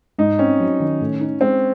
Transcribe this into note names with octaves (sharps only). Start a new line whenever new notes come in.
G#2 D#4
C4 C#4
F#3
D#3
A2
D#4
G#3 C4